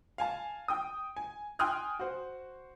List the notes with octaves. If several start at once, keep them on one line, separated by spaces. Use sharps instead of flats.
F5 G#5 A5
G5 D#6
G#5
G5 G#5 C6 D#6 F6 F#6
F#4 C5